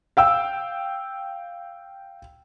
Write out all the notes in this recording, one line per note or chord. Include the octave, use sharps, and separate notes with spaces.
F5 G5 E6